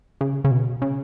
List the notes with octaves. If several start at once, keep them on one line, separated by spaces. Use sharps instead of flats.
C#3
C#3
B2
C#3